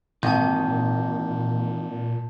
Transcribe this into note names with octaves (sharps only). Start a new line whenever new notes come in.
G#1 A#2 E3 A#3 D#4 A5 G6